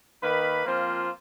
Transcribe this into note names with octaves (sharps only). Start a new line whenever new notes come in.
D#3 A#3 B4 B5
F3 A#3 C4 F4